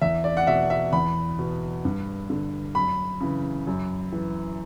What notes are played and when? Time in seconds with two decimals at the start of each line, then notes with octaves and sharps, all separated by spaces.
0.01 E2 E5
0.24 D5
0.37 F#5
0.47 B2 E5
0.70 E5
0.93 E2 B5
1.39 B2
1.85 G2
2.30 D3
2.75 F#2 B5
3.20 C#3 E3
3.67 F#2
4.12 E3